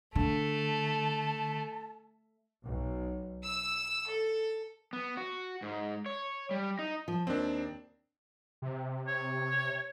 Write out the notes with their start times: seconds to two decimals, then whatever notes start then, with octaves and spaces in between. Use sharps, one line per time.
0.15 D3 A3 A5
2.63 B1
3.43 E6
4.09 A4
4.93 B3
5.17 F#4
5.62 G#2
6.06 C#5
6.51 G3
6.79 D#4
7.08 F3
7.27 D#2 C4 D4
8.62 C3
9.07 C#5